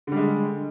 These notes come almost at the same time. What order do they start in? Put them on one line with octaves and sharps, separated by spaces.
D3 G3 G#3